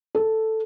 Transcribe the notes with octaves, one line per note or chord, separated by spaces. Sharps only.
A4